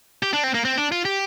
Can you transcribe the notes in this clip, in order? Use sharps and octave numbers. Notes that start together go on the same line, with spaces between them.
G4
D4
C4
A#3
C4
D4
F4
G4